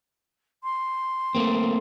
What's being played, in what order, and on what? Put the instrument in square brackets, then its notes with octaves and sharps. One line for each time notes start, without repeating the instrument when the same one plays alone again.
[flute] C6
[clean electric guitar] A3 A#3 C4